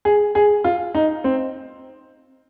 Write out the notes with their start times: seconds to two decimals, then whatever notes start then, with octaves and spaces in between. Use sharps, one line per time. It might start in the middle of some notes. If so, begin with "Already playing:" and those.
0.05 G#4
0.35 G#4
0.64 F4
0.95 D#4
1.24 C4